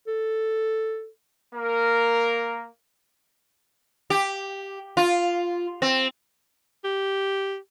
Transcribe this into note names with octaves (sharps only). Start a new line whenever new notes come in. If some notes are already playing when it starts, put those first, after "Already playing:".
A4
A#3 A#4
G4
F4
C4
G4